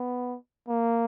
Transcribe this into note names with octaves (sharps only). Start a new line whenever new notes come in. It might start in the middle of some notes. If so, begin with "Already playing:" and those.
Already playing: B3
A#3